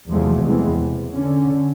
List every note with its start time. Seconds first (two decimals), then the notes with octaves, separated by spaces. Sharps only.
0.10 E2 C3 F3 F#3 G#3 A3
0.44 E2 C3 E3 G#3 B3 C4
0.78 C3
1.12 D3 C#4